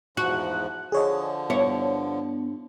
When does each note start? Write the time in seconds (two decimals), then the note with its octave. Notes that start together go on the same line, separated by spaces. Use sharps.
0.17 E2 G#2 F3 F#4 F#6
0.92 D3 F3 G#4 C#5 D#5
1.50 G2 B3 E4 C#5